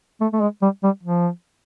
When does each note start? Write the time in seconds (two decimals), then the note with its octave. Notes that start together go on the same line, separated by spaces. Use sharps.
0.21 A3
0.33 A3
0.41 G#3
0.62 G3
0.83 G3
1.03 F3